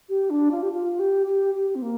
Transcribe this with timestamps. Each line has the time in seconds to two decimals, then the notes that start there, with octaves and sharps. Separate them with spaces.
0.09 G4
0.30 D4
0.51 F4
0.62 G4
0.72 F4
0.99 G4
1.27 G4
1.54 G4
1.75 C4
1.82 A#3